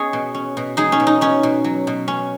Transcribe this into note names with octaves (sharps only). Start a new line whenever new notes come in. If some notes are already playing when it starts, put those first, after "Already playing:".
Already playing: B3 C#4 G#4 C#5 D#5
B2
C#4
B2
G#3 D#4 G#4
C#4
B2
D#4
B3 C#4
B2
F#3
B2
C#4